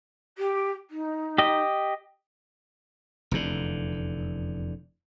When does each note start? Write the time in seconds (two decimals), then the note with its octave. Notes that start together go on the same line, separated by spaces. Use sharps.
0.38 G4
0.90 D#4
1.38 G4 D#5
3.31 F1 E2 D3